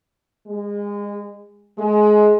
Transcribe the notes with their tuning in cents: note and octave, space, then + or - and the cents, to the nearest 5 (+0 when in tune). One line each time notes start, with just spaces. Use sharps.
G#3 -25
G#3 +20